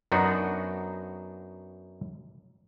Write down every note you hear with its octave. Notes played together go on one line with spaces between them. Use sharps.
F#2 B3 D4 D#4 F#4